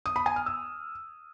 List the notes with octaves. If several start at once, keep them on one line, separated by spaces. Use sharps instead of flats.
D#6
B5
G#5
F6
E6